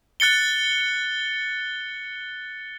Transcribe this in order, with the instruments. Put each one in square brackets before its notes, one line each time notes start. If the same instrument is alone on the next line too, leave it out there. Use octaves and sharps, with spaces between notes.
[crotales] F#6 A6 C#7 G7